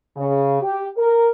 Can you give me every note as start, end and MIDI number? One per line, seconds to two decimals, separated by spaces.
0.17 0.58 49
0.62 0.86 67
0.97 1.30 70